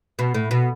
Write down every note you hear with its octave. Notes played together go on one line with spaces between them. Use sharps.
B2
A2
B2